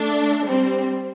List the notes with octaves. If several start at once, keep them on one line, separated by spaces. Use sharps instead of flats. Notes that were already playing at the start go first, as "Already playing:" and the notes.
Already playing: A3 D4
G3 C4